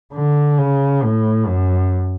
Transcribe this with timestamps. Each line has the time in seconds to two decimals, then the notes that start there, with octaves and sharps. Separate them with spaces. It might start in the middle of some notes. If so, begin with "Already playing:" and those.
0.14 D3
0.58 C#3
1.03 A2
1.47 F#2